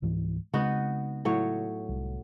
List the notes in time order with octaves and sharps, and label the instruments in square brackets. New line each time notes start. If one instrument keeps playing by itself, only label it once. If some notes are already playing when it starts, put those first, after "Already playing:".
[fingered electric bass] C#2 G#2 E3
[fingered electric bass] C#3 G#3 C4 [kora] B3 D#4 F#4
[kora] A2 F#3 C#5
[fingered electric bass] C2